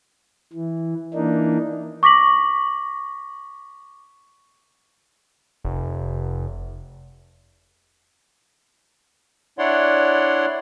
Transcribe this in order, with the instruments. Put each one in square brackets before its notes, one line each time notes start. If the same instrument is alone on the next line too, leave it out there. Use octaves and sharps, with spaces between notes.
[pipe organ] E3
E3 A#3 D4 D#4
[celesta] C#6 D6 A#6 B6 F#7
[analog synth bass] F1
[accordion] D4 E4 C#5 D5 F#5 C6